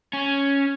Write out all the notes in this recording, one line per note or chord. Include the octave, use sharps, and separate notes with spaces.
C#4